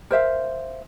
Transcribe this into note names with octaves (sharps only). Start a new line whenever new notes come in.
A#4 C5 E5 F5